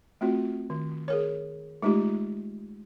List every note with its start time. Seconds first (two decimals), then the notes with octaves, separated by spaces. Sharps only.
0.21 A3 C4 F4 F#4
0.70 D#3
1.08 G#4 A#4 C#5
1.82 G#3 A3 D#4 F4 G4